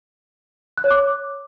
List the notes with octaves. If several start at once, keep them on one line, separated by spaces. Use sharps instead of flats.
F#6
C#5
D6